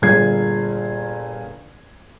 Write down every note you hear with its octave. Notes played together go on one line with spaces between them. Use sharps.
G1 A#2 G#4 G#6 C7